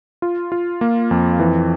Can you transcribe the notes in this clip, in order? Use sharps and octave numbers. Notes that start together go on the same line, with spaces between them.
F4
F4
A#3
F2
E3